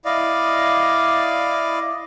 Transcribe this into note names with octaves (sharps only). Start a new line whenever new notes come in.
E4 D5 D#5 F5